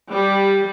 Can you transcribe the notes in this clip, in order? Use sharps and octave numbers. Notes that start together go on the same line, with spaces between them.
G3